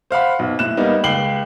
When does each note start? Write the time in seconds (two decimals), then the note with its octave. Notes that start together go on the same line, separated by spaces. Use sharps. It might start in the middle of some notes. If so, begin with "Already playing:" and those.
0.11 C5 F5 F#5 B5
0.39 B1
0.59 A2 F#6 E7
0.77 G3 A#3 B3 D#4
1.04 C#2 G5 C7 F#7 G7